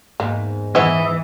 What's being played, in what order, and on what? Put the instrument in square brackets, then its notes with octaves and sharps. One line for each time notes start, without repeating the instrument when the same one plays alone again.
[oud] E2 G#2 [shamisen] A#3
[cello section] E3 [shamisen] B3 C#4 E4 [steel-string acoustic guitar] D#5 E5